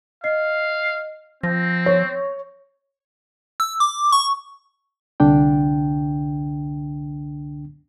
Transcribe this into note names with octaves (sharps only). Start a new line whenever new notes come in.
D#5 F5 C7
F3 C4 A#6
C#5
E6
D6
C#6
C2 D3 D4 G5